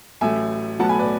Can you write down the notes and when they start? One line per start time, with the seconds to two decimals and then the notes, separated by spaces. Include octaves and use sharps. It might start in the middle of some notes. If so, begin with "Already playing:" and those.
0.21 A1 A2 F#3 A3 E5 G#5
0.79 B1 A2 F#3 B3 F#5 A5
0.89 G#5 B5
0.99 B4 D5